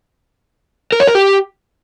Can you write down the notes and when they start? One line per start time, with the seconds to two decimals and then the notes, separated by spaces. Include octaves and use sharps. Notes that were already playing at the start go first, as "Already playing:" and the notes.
0.92 A#4
1.00 C#5
1.07 A#4
1.15 G4